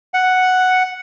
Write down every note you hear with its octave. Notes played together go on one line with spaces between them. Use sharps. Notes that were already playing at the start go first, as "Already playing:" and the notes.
F#5